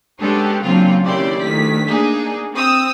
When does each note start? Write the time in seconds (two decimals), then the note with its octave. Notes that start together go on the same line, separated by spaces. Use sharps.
0.19 G#3 B3 C#4 D4 G4 A4
0.62 A#2 C#3 F#3 C4 D4 F4
1.03 D#2 C#3 E4 G4 D5 C6
1.42 D2 D#3 B6
1.89 A#3 D4 D#4 G#4
2.53 C4 D#6 E6